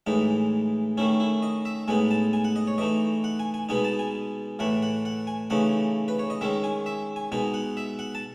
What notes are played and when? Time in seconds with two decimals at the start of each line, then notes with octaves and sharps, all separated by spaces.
0.07 A2 E3 G#3 D#4
0.97 D#3 A3 C#4 E4
1.20 E4
1.42 D#5
1.65 E5
1.88 A2 G#3 B3 D#4 G#5
2.11 A5
2.33 G#5
2.44 F#5
2.56 D#5
2.67 C#5
2.78 E3 A3 D#4 D#5
3.24 F#5
3.40 G#5
3.54 G#5
3.69 B2 G#3 B3 D#4 G#5
3.84 A5
3.99 G#5
4.59 A2 E3 A3 F#5
4.82 F#5
5.05 F#5
5.27 G#5
5.50 C#3 E3 A3 D#4 F#5
6.08 B4
6.19 C#5
6.30 D#5
6.41 D#3 G#3 C#4 E5
6.64 G#5
6.86 E5
7.16 G#5
7.32 B2 G#3 D#4 G#5
7.54 F#5
7.77 E5
7.99 F#5
8.15 A5